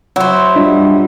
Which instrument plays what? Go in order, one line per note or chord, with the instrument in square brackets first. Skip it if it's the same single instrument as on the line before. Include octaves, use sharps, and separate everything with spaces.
[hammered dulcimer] F#3 [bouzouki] E4 C5
[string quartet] G3 [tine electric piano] D4 F4 D#5